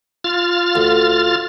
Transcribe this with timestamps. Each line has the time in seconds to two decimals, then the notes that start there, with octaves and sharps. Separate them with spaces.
0.24 F4 F6 A6
0.75 D2